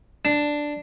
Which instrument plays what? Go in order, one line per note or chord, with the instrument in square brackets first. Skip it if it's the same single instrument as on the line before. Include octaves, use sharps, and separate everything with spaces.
[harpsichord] D4